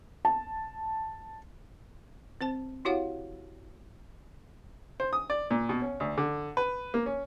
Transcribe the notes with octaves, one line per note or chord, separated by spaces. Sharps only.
A5
C4 C5 A5
E4 F#4 G4 C#5 F5 F#5
C5
D#6
D5
A#2
B2
C#4
D2
D3
B4
A#3
C#4